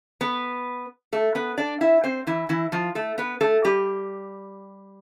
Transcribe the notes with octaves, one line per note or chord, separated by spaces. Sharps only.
B3 B4
A3 A4
B3 B4
D4 D5
E4 E5
C4 C5
E3 E4
E3 E4
F3 F4
A3 A4
B3 B4
A3 A4
G3 G4